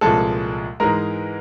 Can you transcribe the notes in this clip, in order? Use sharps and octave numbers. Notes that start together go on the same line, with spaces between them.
C2 A#2 F3 G#3 A4 A5
G#2 E3 G#3 A#4 A#5